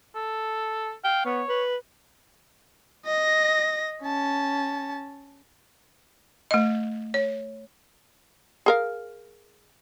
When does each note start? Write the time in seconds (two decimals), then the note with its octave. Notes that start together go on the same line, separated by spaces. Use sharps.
0.15 A4
1.04 F5 G5
1.25 B3 C#5
1.49 B4
3.05 D#5 A#6
4.03 C#4 A5
6.51 A3 D#5
7.14 C#5
8.66 G#4 A#4 F5